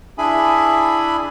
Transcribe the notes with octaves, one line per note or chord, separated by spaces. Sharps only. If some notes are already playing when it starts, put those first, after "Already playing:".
D4 E4 G#4 E5 G#5 B5